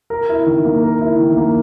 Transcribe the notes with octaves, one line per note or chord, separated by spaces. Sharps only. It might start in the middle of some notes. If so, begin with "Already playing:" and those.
A#4
E4
D#3
A#3
A#4
E4
D#3
A#3